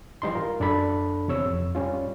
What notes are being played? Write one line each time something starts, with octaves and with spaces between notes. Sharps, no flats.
E3 G3 D#4 C6
F4 A#4
F#2 D4 A4 B5
E2 C3 C#5 E6
F2
G3 C#4 F4